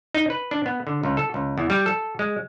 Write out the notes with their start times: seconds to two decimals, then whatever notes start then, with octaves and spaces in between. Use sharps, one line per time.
0.15 D#4
0.30 B4
0.51 D4
0.66 B3
0.87 D3
1.03 C#2
1.17 A4
1.34 C#2
1.58 E2
1.70 G3
1.86 A4
2.19 G#3